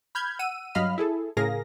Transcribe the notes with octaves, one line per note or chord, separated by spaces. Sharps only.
B5 F6 G6 G#6
F#5 E6 D#7
G2 F#3 D#5 F5 B5 F6
E4 G#4 A4
A2 C#3 G#4 A#4 F5 A#6